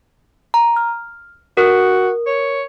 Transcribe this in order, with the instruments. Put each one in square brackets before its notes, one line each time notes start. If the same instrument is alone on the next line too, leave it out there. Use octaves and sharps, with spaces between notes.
[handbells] A#5
F6
[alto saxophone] F#4 [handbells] A#4
[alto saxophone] C#5